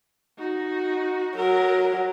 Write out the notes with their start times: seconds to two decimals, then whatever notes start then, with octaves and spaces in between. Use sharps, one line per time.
0.38 D#4 F#4
1.36 F#3 A#4